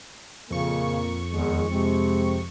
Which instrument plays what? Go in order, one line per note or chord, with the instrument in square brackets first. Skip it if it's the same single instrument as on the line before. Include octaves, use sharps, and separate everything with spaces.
[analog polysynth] F2 C#6 [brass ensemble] A#2 A#3 [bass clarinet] C#3
[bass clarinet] E2 [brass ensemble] D#3 G#3
[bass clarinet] C3 [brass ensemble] G#3 C4